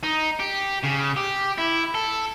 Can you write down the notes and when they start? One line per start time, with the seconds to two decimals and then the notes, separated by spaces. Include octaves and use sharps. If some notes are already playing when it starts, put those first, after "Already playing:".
0.04 D#4
0.40 G4
0.84 C#3
1.17 G4
1.58 E4
1.95 A4